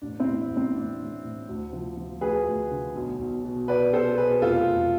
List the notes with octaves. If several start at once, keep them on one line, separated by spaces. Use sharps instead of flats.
A1 D4
C4 E4
A1
A1
C4
A1 D4
A2
A2
D2
F3
F3
D2 G#4 B4
D2
D3
B1
B1
B2
B2 B4 D5
B2 A4 C5
B2 G#4 B4
F1 F4 A4
F1